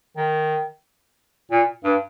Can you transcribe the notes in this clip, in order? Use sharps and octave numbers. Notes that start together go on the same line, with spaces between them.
D#3
A#2
G2